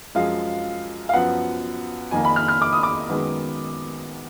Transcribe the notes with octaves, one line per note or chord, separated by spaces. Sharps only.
F#2 F3 G#3 F5
F5
F#2 F3 B3 F#5
F2 D#3 A#3 G#5
B5
F6
F6
D6
D#6
D6
F#2 D#3 G#3 B3